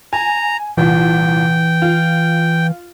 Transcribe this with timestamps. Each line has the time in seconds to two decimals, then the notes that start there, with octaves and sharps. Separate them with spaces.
0.13 G#5 A#5
0.77 C2 A#2 E3 G5
1.82 F4